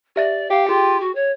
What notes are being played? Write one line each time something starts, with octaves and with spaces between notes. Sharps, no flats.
G4 D5 E5 A6
G4 F5
F4 G#4 G5
F#4
C#5